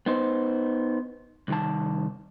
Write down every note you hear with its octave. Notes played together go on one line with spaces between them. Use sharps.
B3 D#4 C5
C2 D#3 A5